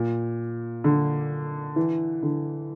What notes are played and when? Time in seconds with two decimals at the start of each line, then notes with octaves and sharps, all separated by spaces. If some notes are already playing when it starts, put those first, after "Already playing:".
Already playing: A#2
0.84 D3
1.76 E3
2.23 D3